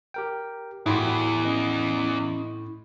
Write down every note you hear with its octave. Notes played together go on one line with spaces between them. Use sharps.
G4 A#4 G5
E2 A2 E4 F#4 G4 B5 C6
C#4 D#5